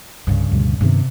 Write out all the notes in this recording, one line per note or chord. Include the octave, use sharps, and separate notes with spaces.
C2 G2 C#3
D2 B2 G3
G2 C3 D#3 B3